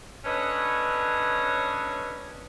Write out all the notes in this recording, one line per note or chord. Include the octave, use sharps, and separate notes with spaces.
C#4 D4 A4 B4 C#5 D#5